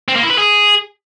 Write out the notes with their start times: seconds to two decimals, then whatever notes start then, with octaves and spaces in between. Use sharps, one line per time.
0.08 C4
0.16 A#3
0.23 E4
0.31 B4
0.38 G#4